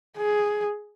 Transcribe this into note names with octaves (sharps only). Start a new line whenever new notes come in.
G#4